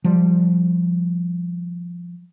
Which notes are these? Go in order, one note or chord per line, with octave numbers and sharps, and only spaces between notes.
F3 G3